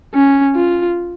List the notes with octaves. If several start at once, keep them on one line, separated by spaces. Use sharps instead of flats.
C#4
F4